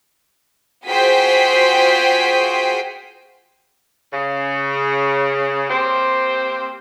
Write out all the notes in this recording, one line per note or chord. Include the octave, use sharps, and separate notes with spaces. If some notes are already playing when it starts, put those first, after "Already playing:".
F4 F#4 G#4 C5 G5 B6
C#3
A#3 C4 G4 C5